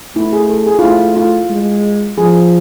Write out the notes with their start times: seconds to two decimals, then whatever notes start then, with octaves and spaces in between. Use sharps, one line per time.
0.16 A3 E4
0.33 G#4
0.50 A4
0.67 G#4
0.79 F4
0.82 A3 E4
1.16 F4
1.50 G#3
2.18 F3 G#4